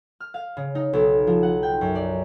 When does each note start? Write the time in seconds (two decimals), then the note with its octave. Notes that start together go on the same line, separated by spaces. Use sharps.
0.20 F6
0.34 F5
0.57 C#3
0.75 D#4
0.93 B1
1.27 F3
1.43 F#5
1.63 G5
1.81 F#2
1.95 D5